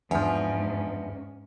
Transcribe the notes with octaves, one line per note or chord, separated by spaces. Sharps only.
E2 G#2 F3 C#4 D4 B4